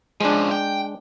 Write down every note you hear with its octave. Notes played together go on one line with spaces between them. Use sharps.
C#2 F3 G#3 D4
G5